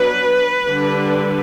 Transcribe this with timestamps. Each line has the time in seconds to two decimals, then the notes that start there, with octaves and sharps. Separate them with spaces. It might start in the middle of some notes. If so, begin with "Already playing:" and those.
Already playing: F#3 B3 D4 B4
0.67 D3 G3 D4